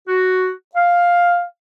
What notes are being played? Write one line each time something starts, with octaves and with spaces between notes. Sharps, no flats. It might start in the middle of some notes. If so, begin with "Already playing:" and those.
F#4
F5